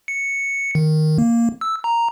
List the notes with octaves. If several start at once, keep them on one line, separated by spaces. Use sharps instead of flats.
C#7
D#3
A#3
E6
A#5